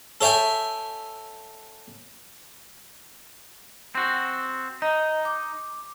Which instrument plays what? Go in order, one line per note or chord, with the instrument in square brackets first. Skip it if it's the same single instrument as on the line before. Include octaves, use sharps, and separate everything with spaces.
[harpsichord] A4 C#5 E5 G5 G#5
[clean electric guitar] C4 F#4
[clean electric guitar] D#4 [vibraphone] D#5
[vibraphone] D6